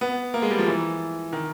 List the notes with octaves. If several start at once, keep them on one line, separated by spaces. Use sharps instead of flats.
B3
A#3
G#3
G3
F3
E3
D#3